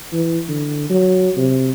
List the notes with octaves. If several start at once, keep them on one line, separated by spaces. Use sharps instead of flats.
E3
D3
F#3
C3